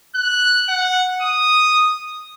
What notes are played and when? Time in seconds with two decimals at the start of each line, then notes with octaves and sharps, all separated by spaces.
0.15 F#6
0.69 F#5
1.22 D#6